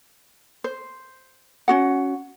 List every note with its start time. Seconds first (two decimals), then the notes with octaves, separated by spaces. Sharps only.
0.64 C5
1.68 C#4 F#4 F#5